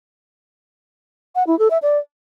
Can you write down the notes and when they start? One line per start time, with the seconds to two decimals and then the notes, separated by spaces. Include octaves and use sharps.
1.35 F#5
1.47 E4
1.59 A4
1.70 E5
1.82 D5